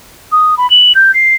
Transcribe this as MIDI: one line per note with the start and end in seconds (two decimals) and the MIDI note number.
0.32 0.55 87
0.57 0.68 83
0.70 0.92 102
0.95 1.11 91
1.14 1.35 96